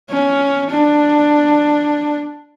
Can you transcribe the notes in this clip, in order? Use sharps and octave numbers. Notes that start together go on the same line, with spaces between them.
C#4
D4